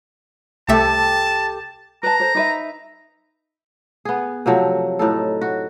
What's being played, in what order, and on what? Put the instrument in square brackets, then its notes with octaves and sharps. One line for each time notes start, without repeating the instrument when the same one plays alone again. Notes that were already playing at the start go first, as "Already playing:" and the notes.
[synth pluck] C2 A3 E5 [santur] G4 A4 [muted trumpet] A5
[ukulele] B4 A5 [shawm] A#5
[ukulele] A4 C5
D#4 B4 E5
[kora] B3 G#4
C3 F3 F#3 A3
A2 D#4 A4
F#4